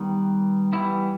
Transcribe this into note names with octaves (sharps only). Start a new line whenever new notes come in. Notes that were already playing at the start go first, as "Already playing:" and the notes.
Already playing: D#3 G3 B3
E3 G3 B3 E4